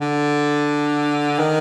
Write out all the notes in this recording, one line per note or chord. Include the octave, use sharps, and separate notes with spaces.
D3
D#3